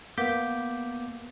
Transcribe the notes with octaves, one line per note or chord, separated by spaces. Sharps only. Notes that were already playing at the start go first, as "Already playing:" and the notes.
A#3 B3 D6 G6 B6